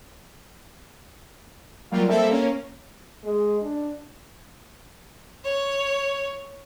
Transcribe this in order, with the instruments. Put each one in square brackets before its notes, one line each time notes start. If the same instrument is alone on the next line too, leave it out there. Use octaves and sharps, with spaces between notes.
[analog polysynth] F#3 G3 A#3 F4
G3 A#3 C4 A4 E5
A#3 C#4
[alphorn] G#3
D4
[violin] C#5